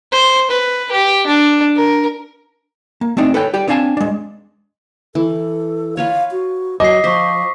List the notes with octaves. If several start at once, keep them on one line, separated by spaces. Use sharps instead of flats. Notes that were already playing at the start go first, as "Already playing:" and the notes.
C5
B4
G4
D4
A#4
A#3
A3 C4 D4 D#4
A4 B4 C#5 G5
G4 D5 G5
B3 C4 D4 F5 G#5 A5
G#3 D4
E3 A4
F4 B4 C#5 F5
F#4
F#3 C5 D#5 D6 C7
F3 C5 C#6 D6 B6